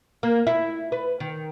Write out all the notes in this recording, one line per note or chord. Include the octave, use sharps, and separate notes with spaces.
A#3
E4
B4
D#3